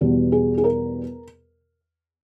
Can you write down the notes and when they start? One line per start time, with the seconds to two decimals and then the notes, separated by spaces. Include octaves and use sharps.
0.01 E2 B2 G3
0.32 G#4
0.57 G#4
0.64 A#4